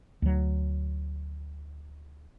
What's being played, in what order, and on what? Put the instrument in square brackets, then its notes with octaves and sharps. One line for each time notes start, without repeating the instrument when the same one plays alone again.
[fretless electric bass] D2 F#3